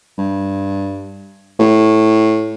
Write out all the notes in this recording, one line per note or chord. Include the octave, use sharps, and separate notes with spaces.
G2
A2